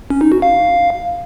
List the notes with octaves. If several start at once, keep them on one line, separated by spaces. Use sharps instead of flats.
C#4
D#4
F#4
F5